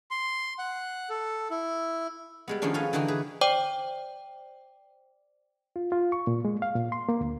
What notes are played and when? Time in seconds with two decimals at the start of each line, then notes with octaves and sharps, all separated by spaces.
0.11 C6
0.59 F#5
1.10 A4
1.51 E4
2.48 G3 G#3 B3
2.62 D#3 F3 G#3 A#3 C#4 D4
2.74 C#4 A4 B4 F5 G#5
2.93 D3 E3 D4 D#4 F#4 G4
3.08 G#4 B4
3.41 C5 D5 G5 D6
5.76 F4
5.92 F4
6.12 C#6
6.27 A#2
6.45 G#3
6.62 F5
6.75 A#2
6.92 C6
7.09 A#3
7.21 D2